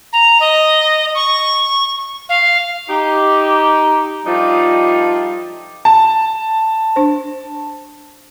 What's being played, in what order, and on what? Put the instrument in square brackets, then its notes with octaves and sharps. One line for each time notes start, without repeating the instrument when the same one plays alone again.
[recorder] A#5
D#5
C#6
F5
[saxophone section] D#4 G4
F3 G3 A3 D4 D#4 F4
[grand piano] A5
[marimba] D4 C5